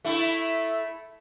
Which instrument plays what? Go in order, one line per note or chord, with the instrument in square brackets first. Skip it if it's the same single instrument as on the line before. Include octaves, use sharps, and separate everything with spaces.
[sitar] A3 E4